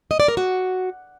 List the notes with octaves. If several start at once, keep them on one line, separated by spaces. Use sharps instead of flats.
D#5
D5
A#4
F#4